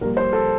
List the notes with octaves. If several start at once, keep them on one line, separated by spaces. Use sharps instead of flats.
A#1 A#2 G3 A#4
C5
A4